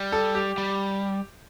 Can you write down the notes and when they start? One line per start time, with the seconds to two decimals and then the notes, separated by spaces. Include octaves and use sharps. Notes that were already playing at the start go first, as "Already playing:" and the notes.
Already playing: G3
0.12 A4
0.35 G4
0.58 G3